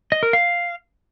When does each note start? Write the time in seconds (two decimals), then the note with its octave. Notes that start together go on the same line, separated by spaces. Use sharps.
0.12 D#5
0.23 A#4
0.33 F5